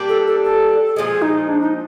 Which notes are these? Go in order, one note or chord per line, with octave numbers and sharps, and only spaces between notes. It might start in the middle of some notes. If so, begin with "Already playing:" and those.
Already playing: G3 A#3 D4 G4
A4
A4
A4
A#2 F3 G#3 G#4
D#4
D4
D#4